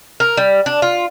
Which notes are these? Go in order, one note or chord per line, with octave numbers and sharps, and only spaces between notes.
A#4
G3
D4
F4